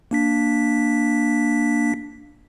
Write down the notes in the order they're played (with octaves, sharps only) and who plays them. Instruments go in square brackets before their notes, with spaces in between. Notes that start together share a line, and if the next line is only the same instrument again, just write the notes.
[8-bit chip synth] A#3 D4 B6